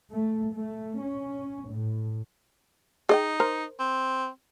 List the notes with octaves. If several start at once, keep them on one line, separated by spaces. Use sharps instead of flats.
A3
A3
C#4
A2
D#4 G#4 D#5 G5
A#4 C5 A#5
C4